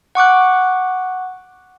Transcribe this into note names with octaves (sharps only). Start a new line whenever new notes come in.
F#5 C#6 D6 F#6